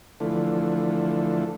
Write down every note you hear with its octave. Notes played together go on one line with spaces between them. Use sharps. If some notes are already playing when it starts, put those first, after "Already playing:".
D3 E3 F3 A3